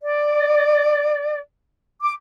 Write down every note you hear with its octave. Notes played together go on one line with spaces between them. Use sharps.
D5
D6